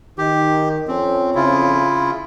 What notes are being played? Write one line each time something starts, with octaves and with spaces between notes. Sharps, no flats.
D#3 G4
F2 C4 C#4
C#3 E4 F4